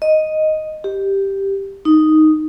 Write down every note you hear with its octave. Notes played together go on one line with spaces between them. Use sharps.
D#5
G4
D#4